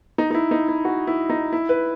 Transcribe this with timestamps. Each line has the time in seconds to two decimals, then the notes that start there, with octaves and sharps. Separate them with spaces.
0.18 D#4
0.31 D#4
0.34 E4
0.51 D#4
0.68 E4
0.85 F#4
1.07 E4
1.30 D#4
1.53 E4
1.69 B4